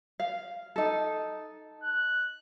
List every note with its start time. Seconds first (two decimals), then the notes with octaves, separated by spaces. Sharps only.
0.20 F5
0.76 D#4 A4
1.84 F#6